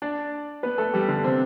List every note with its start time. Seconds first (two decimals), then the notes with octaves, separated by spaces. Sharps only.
0.02 D4 D5
0.63 B3 B4
0.78 A3 A4
0.93 G3 G4
1.08 D3 D4
1.24 C3 C4